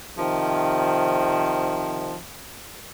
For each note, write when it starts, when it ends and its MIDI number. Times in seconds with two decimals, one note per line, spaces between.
0.18 2.17 48
0.18 2.17 51
0.18 2.17 53